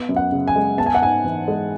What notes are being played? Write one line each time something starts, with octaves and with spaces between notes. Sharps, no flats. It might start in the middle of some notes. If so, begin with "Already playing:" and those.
Already playing: B3
F#2
F#5
C#3
G#5
G#3
B3 A5
G#5
F#5
G#2 G#5
E3
G#3